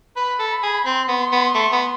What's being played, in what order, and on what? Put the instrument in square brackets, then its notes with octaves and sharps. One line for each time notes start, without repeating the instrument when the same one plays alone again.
[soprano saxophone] B4 [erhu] B5
[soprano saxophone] A4
[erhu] B5
[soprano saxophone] G#4
[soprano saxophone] C4 [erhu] C6
[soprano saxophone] B3
B3
A3
B3